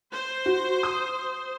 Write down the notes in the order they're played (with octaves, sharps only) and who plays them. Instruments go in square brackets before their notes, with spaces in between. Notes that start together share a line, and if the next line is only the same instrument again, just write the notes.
[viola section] C5
[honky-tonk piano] F#4
D#6